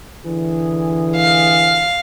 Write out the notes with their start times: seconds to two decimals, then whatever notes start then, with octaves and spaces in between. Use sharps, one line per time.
0.24 D3 E3 G#4
1.16 F5